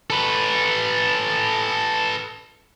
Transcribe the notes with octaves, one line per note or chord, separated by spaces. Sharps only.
A4 B4